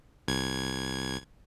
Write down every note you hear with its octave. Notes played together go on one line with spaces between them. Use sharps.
C2 G#6